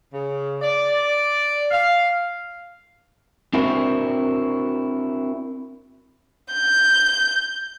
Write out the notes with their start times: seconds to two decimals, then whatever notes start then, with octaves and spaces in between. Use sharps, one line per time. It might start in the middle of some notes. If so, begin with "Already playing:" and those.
0.13 C#3
0.61 D5
1.71 F5
3.53 C4 D4 E4 F#4 A#4 C5
6.54 G6